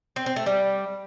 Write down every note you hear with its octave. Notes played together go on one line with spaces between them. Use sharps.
C4
C4
A3
G3